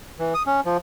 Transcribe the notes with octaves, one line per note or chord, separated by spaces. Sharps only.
E3
D#6
C#4
F3